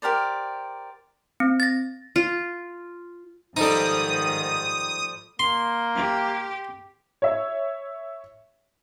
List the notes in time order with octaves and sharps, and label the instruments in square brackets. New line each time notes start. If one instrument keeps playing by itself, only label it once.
[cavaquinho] G4 A#4 C5 D5
[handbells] C4
A6 A#6
[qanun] F4
[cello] G#2 D#3 [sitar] F3 G3 A4 [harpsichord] D#4 [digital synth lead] D#6
[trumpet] A#3 [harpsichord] C6
[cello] G4
[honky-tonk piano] C#5 E5